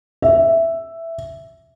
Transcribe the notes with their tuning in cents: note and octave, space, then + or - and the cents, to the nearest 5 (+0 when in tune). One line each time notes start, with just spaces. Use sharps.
E5 +5